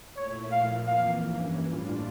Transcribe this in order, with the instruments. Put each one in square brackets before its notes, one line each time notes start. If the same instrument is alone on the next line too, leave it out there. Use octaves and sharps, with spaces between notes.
[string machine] A#2 A3 E4 [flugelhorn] C#5
[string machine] A#2 F3 A#3 [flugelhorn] F5
[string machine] F2 E3 A#3 [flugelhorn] F5
[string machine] G2 E3 A#3 C#4
A2 G3 D4 F4